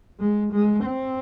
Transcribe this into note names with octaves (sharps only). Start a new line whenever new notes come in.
G#3
G#3
C4